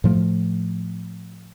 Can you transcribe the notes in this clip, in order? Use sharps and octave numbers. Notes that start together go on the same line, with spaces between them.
A2 F3 A3